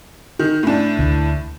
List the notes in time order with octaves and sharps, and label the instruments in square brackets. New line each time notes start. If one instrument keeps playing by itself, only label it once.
[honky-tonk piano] D#3
A2 D4
[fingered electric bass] D2